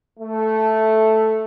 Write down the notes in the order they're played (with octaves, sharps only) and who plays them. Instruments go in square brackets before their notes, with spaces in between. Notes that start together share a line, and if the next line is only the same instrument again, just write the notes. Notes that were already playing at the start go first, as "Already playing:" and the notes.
[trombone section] A3